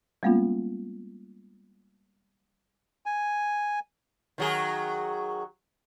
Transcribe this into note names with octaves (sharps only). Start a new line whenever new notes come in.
G3 G#3 A#3 B3 C#4 F4
G#5
D#3 F#3 G#4